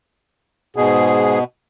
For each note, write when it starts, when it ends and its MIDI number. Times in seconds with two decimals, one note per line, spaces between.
0.76 1.39 44
0.76 1.44 47
0.76 1.39 68